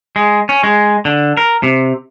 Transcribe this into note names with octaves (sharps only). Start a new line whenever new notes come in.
G#3
C#4
G#3
D3
A#4
C3